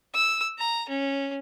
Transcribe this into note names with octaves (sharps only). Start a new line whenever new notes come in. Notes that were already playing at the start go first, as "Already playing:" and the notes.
E6
A#5
C#4